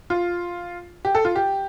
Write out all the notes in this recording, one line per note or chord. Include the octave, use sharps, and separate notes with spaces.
F4
G4
A4
F4
G4